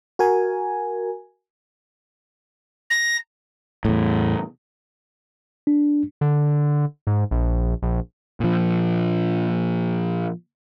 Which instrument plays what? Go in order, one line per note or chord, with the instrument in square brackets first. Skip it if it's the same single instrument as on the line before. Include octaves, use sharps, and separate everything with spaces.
[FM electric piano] F#4 A#4 G#5
[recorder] A#6
[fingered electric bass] E2 A2
[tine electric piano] D4
[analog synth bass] D3
G#2
A#1
A#1
[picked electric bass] A#2 F3